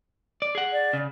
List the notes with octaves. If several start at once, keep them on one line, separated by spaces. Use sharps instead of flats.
D5
G#4 F#5
D5
C#3